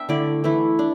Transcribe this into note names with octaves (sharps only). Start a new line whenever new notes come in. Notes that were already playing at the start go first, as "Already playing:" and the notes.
Already playing: B3 D4 E5 G5 A5
D3 A3 E4 D5
E3 A3 E4
D4